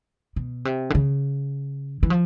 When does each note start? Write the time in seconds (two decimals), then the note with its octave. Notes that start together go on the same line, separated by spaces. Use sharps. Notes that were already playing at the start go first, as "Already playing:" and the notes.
0.36 B2
0.65 C3
0.90 D3
0.95 C#3
2.03 E3
2.10 F3